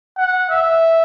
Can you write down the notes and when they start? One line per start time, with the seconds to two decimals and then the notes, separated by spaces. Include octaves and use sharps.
0.18 F#5
0.50 E5